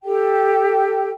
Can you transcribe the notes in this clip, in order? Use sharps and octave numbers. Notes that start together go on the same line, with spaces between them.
G4 A4 G5